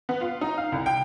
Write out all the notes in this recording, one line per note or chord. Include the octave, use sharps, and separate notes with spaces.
B3
F4
D#4
F5
C2
G5